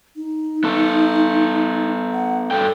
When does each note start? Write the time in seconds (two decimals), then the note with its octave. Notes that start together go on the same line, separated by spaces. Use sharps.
0.16 D#4
0.64 B3 A4
2.13 F#5
2.51 G2 F#3 A4 G5